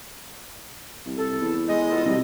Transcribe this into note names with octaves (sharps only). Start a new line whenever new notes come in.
C2
A4
E2
G#3 D#5
B3 F4 A4
C2 B2